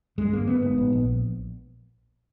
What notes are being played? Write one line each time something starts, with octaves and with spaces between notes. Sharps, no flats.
G2 G#3
G1 A#3
G1 B3
G#2
A#1
A#1